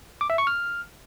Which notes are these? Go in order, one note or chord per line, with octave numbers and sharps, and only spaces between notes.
D6
E5
C#6
F6